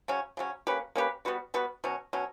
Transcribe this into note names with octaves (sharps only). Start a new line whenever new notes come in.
C#3 F#3 C#4
C#3 F#3 C#4
A#3 C#4 G4 B4
A#3 C#4 G4 B4
G3 B3 F#4 B4
G3 B3 F#4 B4
B2 F#3 C#4
B2 F#3 C#4